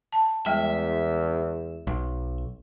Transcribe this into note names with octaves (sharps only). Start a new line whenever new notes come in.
A5
E2 G3 G#3 E5 G5
B1